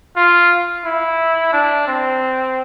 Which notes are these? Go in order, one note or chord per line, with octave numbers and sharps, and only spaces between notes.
F4
E4
D4
C4